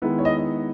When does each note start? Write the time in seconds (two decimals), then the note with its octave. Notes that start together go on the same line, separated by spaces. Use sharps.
0.02 D#3 G#3 B3 E4
0.19 C#5
0.25 D#5